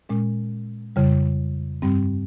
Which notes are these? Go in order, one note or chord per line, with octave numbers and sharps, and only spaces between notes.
A#2 G#3 C#4
F2 C#3 G3
G2 G3 C4